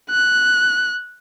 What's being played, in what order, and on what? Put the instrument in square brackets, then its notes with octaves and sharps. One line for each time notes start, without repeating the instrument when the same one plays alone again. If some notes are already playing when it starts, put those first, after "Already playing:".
[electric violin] F#6